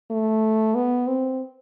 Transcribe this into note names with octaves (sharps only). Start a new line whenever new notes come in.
A3
B3
C4